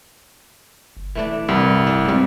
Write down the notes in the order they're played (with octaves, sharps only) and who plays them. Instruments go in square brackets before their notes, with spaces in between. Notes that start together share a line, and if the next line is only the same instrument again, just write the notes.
[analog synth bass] G1
[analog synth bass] D#1 [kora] E3 A3 D4
[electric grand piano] C2 [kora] G2 G3
[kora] D4
[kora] G#2 G3 [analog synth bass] C4